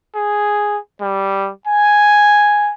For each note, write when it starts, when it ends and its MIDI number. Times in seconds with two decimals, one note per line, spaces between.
0.16 0.78 68
1.02 1.50 55
1.67 2.73 80